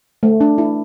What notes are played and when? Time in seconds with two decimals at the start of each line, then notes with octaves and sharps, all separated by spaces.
0.23 A3
0.41 D4
0.58 E4